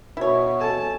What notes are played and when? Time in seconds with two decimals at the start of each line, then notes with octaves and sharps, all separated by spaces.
0.17 B2 E4 C#5
0.61 A4 G#5 A5